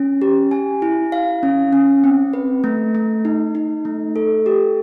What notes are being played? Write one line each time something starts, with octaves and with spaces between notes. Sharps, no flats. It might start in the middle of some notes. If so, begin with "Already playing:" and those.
Already playing: C#4
G4
G#5
E4
F5
C#4
C#4
C4
B4
A3
A3
D#4
D#4
A3
A4
G4